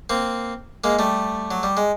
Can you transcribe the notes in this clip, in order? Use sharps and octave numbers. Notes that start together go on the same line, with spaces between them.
A#3 C4
G#3 A#3
G3 A3
F#3
G3
G#3